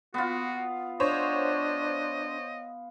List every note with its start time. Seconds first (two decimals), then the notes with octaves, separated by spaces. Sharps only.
0.14 B3 F4 F#4
1.00 D4 C5 C#5 D#5